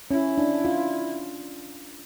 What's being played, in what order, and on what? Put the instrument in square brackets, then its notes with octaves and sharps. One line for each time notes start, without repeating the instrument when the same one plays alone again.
[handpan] C#4 [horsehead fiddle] E4
[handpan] D4
F4